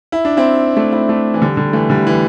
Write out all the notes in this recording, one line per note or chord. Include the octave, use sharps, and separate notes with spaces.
E4
D4
C4 E4
A3 D4
C4 E4
A3 D4
E3
D3 G3
D3 G3
E3 A3
D3 G3
E3